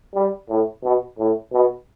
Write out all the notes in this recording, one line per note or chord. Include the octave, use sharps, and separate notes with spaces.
G3
A2
B2
A2
B2